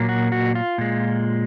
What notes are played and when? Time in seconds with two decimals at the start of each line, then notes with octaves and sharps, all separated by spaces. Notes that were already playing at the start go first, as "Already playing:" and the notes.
Already playing: A#2 F#3 A#3
0.09 F#4
0.32 F#4
0.55 F4
0.78 A#2 G#3